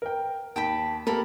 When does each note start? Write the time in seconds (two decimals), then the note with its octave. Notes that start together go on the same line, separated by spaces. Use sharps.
0.02 A#4 G5
0.56 D#2 G5 A5 B5
1.07 A#3 G4 A4 A#4 B5